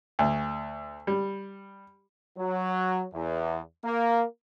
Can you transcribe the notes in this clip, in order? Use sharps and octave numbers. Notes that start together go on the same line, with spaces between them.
D2
G3
F#3
E2
A#3